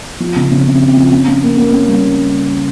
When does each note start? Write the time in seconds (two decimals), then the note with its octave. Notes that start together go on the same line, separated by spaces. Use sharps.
0.20 F3
0.36 C#3
0.51 C#3
0.66 C4
0.81 C4
0.96 F3
1.12 C#4
1.28 C#4
1.43 A#3
1.57 A#3
1.73 C#4
1.88 G3